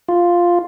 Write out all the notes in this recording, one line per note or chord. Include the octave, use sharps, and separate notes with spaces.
F4